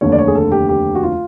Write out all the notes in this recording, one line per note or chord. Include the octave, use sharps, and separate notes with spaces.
F1 D#2 D3 C#5
D5
C#5
G#4
A4
G4
G4
F#4
F4